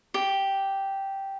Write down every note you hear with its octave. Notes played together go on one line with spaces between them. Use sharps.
G4